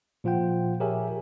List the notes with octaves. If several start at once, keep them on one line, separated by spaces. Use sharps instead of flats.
A#2 F3 F4 F#5 G5
G4 G#4 A#4 C#5 E5 G#5